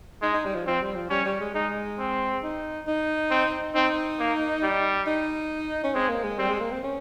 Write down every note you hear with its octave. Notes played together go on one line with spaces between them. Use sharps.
G#3 D#4
D#4
G3
F3
F3 C4
G3
F3
G3 C#4
G3
G#3
G#3 D#4
C4
D#4
D#4
C4
C4 D#4
A#3
G3
D#4
C#4
G#3 C4
A#3
G#3
G3 C4
G#3
A#3
C4
C#4